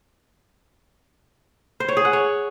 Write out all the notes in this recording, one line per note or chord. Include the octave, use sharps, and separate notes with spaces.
C5
C#5
G#4
F#5
C#5